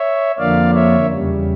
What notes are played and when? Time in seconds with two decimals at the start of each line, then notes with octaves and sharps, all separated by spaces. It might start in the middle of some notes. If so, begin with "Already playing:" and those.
Already playing: C#5 E5
0.38 F2 D3 F3 A#3 D5 F5
0.75 C#5 E5
1.10 E2 C#3 G3